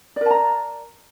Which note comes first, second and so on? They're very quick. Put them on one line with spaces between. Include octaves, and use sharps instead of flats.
D5 A#4 A5 A#5